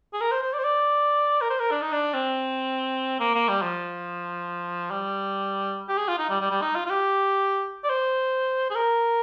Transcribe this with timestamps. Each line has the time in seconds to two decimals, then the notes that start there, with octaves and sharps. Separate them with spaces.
0.13 G#4
0.21 A#4
0.31 C5
0.42 C5
0.53 D5
0.58 C5
0.64 D5
1.41 A#4
1.50 C5
1.59 A#4
1.71 D4
1.82 D#4
1.92 D4
2.14 C4
3.20 A#3
3.34 A#3
3.48 G3
3.62 F3
4.91 G3
5.88 G4
5.97 G#4
6.08 F4
6.19 D#4
6.29 G3
6.40 G3
6.51 G3
6.61 D#4
6.75 F4
6.86 F4
6.90 G4
7.84 D5
7.89 C5
8.70 G#4
8.75 A#4